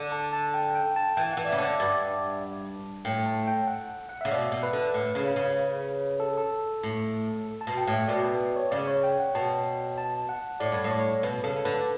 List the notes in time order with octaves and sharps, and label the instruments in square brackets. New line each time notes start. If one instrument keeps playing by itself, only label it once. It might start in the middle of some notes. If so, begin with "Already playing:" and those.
Already playing: [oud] D3
[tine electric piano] A5
A5
G5
G5
A5
[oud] E3 [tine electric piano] G5
[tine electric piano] F#5
[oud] E3
[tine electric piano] D5
E5
[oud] C#3
D3
[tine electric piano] D5
[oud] G2 [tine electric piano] D5
[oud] A2 [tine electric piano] G5
[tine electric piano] A5
G5
F#5
F#5
[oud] C#3 [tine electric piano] E5
[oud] B2 [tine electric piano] D5
[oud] B2
[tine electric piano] B4
[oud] D3
A2
C#3
C#3
[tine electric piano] A4
A4
[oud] A2
[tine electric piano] A5
[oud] B2
[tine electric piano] G5
[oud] A2
[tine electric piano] E5
[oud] B2 [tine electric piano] D5
[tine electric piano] B4
C#5
[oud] C#3 [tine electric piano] D5
[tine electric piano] C#5
G5
F#5
[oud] B2 [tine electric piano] A5
[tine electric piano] A5
F#5
[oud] A2 [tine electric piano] D5
[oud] G2
A2
[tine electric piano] C#5
[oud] B2 [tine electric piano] B4
[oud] C#3 [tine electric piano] A4
[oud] D3 [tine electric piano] B4